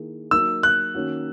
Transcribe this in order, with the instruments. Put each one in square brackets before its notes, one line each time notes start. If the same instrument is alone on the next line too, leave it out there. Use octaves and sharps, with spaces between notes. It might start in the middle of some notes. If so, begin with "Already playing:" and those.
Already playing: [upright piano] D#3 A#3 E4 G#4
[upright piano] F#3 A#3 D#4 [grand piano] E6
[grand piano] F#6
[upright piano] D#3 A#3 C#4 F#4